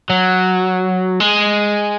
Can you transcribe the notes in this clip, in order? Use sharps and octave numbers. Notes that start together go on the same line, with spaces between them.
F#3
G#3